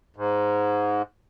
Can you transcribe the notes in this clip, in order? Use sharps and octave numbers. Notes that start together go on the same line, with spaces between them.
G#2